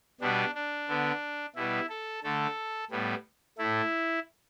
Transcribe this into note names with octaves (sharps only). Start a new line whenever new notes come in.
B2 G3 B3 D4
D4
D3 B3
B2 G3 B3 E4
A4
D3 A3 A4
A2 G3 B3
A2 A3 E4